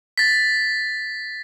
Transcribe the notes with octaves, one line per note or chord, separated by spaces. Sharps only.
A6 B6